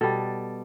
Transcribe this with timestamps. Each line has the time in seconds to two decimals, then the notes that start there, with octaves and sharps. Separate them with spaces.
0.01 B2 G3 A4